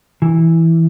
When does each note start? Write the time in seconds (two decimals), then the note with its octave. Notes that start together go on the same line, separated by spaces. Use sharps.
0.22 E3